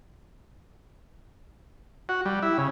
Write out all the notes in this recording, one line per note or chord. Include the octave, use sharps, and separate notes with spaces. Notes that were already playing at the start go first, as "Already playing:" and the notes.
F#4
G3
E4
C#3